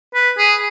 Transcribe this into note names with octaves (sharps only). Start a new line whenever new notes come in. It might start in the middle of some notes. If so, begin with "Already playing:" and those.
B4
G#4